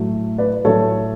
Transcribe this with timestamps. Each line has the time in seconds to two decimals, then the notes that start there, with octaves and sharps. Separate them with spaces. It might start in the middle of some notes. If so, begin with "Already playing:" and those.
Already playing: A2 F#3 A3
0.38 B4 D5
0.65 A2 F#3 A3 A4 C#5